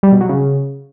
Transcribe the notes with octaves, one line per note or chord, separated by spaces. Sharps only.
G3
B2
F#3
C#3